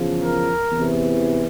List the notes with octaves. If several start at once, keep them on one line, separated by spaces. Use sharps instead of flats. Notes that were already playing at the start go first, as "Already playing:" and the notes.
Already playing: E2 C#3 F3
A#4
E2 C3 E3